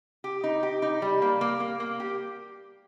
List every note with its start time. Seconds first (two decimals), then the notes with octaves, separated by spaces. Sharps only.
0.24 G4
0.44 D#4
0.63 G4
0.82 D#4
1.02 G3
1.22 A#3
1.41 A#3
1.60 A#3
1.80 A#3
2.00 G4